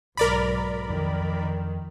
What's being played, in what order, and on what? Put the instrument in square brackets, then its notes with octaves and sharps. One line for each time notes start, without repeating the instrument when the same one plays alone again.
[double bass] B1 G#2 [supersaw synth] A#4 D5 B5
[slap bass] F2 [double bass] D#3